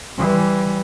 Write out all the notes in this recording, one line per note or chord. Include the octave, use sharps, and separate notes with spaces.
E3 G3